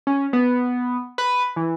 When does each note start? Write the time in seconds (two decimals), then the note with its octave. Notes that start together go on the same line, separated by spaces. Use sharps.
0.07 C#4
0.33 B3
1.18 B4
1.56 E3